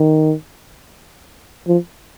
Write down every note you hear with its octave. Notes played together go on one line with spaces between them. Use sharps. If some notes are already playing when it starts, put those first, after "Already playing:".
Already playing: D#3
F3